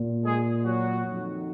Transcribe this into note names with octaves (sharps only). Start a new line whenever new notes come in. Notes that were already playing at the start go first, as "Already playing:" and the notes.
Already playing: A#2
G#3 G#4
F#3 F#4
F2 D#3 F#3